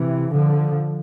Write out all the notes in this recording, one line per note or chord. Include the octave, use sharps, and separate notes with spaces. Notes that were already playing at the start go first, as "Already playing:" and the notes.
Already playing: C3 E3
D3 F3